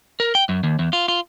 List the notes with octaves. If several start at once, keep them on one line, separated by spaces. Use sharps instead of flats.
A#4
G5
F#2
D#2
E2
F4
F4